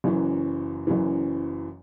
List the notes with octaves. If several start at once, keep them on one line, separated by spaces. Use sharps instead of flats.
F#1 F#2 E3
F#1 F#2 E3